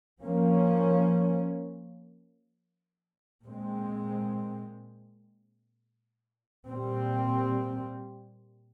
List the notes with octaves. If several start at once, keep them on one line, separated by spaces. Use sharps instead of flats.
F3 A#3 C#4
A#2 G#3 C4
A#2 G3 C4